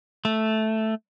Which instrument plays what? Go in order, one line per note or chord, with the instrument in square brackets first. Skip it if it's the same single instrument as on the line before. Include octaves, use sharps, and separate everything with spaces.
[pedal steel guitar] A3